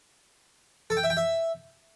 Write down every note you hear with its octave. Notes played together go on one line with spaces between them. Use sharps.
A4
G5
E5
G5
E5